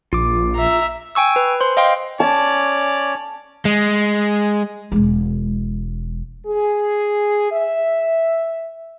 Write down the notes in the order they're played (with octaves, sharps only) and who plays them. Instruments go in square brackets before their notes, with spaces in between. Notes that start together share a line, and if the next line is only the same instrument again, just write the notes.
[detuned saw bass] A#1 [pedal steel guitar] F4 D6
[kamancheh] E5 A#5
[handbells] G5 G#5 C#6 E6
B4
C5 C6
D#5 F5 G5 C6
[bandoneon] C#4 C#5 [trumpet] D5 [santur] A5
[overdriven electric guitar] G#3
[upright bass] E1 G#3
[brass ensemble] G#4
E5